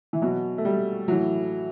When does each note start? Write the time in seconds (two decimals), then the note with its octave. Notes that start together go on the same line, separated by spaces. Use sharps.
0.13 E3
0.22 B2 F#3
0.58 A3
0.65 G3
1.08 A2 E3 F#3